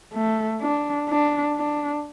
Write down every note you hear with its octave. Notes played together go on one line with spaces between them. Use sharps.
A3
D4
D4
D4